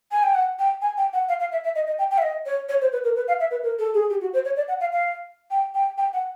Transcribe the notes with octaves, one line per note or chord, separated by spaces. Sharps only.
G#5
G5
F#5
G5
G#5
G5
F#5
F5
F5
E5
E5
D#5
D#5
G5
G5
E5
D#5
C#5
C#5
C5
B4
A#4
B4
F5
E5
B4
A#4
A4
G#4
G4
F#4
C5
C#5
D5
F#5
F5
F5
G5
G5
G5
F#5